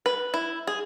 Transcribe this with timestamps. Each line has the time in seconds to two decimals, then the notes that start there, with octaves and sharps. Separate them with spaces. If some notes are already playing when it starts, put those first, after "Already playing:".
0.06 B4
0.34 E4
0.67 G#4